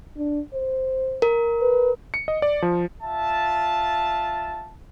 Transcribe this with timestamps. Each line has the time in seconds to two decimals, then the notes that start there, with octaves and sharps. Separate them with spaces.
0.17 D4
0.54 C5
1.22 A#4
1.62 B4
2.14 C#7
2.28 D#5
2.42 D5
2.62 F3
3.03 F4 E5 A5